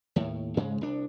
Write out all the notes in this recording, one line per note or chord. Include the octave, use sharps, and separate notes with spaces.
D#2 A2
G#2 C#3 G#3
C2 D4